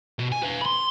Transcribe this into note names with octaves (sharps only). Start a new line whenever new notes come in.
B2
G#5
B4 F5
B5 C6